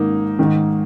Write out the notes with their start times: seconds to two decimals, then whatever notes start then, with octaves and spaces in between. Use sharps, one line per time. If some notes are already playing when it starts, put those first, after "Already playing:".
Already playing: G#2 D#3 A#3 D#4
0.39 G#2 D#3